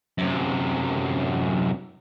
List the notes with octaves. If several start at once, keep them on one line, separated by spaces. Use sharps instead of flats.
F#2 C3